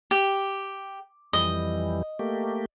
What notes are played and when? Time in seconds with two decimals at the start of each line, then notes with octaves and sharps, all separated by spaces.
0.11 G4
1.33 F2 E3 G3 D#5
2.19 A3 A#3 G4